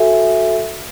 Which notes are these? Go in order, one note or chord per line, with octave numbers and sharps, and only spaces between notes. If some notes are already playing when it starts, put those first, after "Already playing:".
Already playing: F#4 A4 E5 G#5